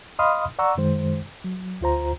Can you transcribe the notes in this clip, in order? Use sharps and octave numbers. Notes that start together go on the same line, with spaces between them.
D#5 F5 B5 C6 D#6 F6
D5 F#5 A#5 C#6 E6
F#2 D#3 G#3 C5
F#3
D2 F4 C5 A#5